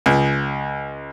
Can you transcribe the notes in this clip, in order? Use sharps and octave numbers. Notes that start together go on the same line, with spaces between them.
C#2